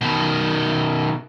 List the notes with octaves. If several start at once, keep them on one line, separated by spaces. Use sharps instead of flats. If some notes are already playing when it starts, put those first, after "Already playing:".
B2 D#3